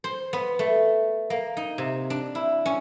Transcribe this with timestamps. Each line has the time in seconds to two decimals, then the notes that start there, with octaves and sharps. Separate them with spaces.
0.04 C5
0.33 B3
0.59 A3
1.30 A#3
1.57 D#4
1.78 C3
2.10 D4
2.35 E4
2.66 C#4